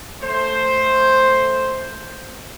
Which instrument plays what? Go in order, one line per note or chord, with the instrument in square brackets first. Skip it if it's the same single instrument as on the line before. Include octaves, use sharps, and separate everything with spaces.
[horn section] A3 C5